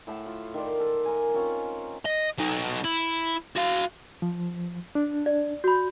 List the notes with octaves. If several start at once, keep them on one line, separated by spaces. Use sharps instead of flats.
A2 F#5 A5
F4
D#3 F4 D5
A4
A#4 G#5
C4 C#4 F4 C#5
D#5
F#3 D#4
E4
F#4 F5
F3
D4
D5
F#4 B5 G6